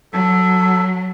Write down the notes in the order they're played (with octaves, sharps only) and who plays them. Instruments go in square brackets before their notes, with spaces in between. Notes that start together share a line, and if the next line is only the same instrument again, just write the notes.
[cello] F#3 [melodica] A4